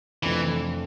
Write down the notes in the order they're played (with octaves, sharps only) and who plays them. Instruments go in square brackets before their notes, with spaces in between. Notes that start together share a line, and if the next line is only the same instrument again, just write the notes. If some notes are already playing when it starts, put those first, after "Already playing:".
[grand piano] F2 C3 F3 A3 D4 [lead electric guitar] E3